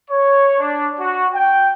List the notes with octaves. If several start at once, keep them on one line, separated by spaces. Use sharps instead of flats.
C#5
D4
F#4
G5